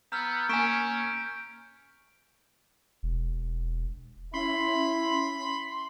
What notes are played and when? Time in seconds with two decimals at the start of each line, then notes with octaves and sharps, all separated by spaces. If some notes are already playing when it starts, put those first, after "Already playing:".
0.12 B3 A#5 E6 F6 G6
0.49 A#3 C#4 G#5 C#6 B6 D7 E7
3.03 E1
4.34 C#4 E4 B5 C6